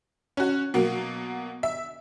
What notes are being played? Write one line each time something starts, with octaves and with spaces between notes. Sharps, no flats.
C#4 F#4
B2 F#3 A#3
E5